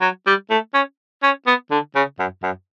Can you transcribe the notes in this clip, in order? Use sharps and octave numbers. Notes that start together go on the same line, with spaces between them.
F#3
G3
A3
C#4
C#4
B3
D3
C#3
F#2
F#2